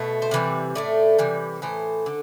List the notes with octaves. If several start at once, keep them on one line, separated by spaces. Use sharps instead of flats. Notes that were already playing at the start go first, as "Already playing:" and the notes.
Already playing: B2 A3
C5
C3 E3 G3 D5
A2 E3 A3 D5
C3 E3 G3
A2 E3 C5
D3